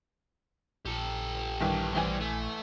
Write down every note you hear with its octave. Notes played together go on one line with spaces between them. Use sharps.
A#1 G4 A4
G2 D#3 E3
A1 E3 G3 C4 G#5
A3